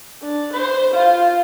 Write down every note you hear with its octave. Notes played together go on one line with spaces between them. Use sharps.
D4
C5
F4